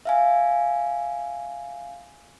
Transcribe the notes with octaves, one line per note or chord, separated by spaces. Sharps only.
E5 F5 G#5